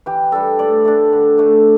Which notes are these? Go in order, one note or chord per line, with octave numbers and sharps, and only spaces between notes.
E3 G4
G3 D4 A4
A2 D5
A3 D4
D3
A3 D4